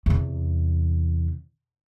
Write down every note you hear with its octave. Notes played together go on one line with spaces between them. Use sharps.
E2 C3